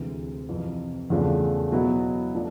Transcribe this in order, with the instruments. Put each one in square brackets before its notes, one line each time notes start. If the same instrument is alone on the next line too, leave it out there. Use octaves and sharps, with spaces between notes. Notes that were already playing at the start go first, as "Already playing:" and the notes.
Already playing: [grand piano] D2 C3 E3 G#3
F2 C3 E3
E2 C#3 F3 A3 D4
B2 F#3 B3 E4
F3 A3 D4